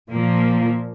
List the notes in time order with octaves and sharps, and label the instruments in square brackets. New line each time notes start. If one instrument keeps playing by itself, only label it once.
[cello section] A#2 F3 A#3